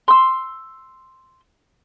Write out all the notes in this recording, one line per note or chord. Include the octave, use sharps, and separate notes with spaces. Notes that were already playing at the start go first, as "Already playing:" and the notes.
C6 E6